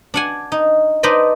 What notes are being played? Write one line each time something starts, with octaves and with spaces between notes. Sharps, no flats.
D4 F#5 G#5
D#4
D4 D#4 B4 C5 D5 D#5